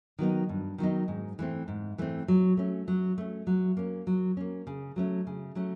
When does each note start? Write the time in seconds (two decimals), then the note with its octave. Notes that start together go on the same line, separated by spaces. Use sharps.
0.19 D#3 F#3 B3 D#4
0.49 G2
0.78 D#3 F#3 B3 D#4
1.08 G#2
1.39 E3 A3 C4
1.68 G#2
1.98 E3 A3 C4
2.28 F#3
2.57 A3 C#4
2.88 F#3
3.18 A3 C#4
3.47 F#3
3.77 A#3 C#4
4.07 F#3
4.37 A#3 C#4
4.67 C#3
4.96 F#3 A3 C#4
5.27 C#3
5.55 F#3 A3 C#4